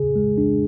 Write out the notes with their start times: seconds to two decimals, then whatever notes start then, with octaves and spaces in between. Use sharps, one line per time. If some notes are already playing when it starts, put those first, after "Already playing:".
Already playing: C#3 G#4
0.16 G#3
0.38 D4